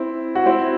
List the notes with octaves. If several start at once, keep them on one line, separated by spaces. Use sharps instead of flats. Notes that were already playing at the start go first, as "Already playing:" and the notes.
Already playing: C4 E4
F#4
C4 E4